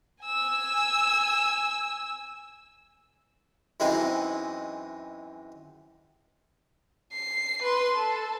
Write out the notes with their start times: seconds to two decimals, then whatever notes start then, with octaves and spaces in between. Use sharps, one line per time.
0.24 G#5 E6
3.80 F#2 E3 G#3 C4 D#4 E4
7.13 C7
7.62 B4 C6
7.95 A4